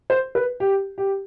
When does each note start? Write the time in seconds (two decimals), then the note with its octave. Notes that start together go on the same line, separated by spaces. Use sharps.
0.10 C5
0.35 B4
0.60 G4
0.98 G4